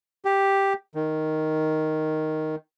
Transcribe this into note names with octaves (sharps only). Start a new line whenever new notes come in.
G4
D#3